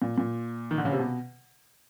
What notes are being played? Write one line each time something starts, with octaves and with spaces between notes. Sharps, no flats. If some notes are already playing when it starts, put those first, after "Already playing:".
A#2
A#2
D#3
D3
C#3
C3
B2